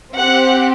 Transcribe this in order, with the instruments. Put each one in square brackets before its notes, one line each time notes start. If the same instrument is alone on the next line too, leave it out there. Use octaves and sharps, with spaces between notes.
[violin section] C4 G4 F#5